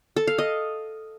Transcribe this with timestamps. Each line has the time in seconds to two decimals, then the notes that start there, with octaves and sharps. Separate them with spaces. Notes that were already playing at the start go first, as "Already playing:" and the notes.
0.16 A4
0.27 F5
0.38 D#5